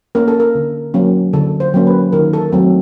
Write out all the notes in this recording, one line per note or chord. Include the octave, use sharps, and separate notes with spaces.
A#3 C#4 A#4
A4
A#4
D3
F#3 A#3 C#4
D3 A4
C5
F#3 A#3 C#4
B4
D#3 A#4
A4
F#3 A3 C4